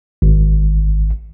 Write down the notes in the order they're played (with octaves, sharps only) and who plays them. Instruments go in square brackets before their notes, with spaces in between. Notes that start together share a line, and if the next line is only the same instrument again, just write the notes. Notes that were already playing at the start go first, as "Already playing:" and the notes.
[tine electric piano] G#1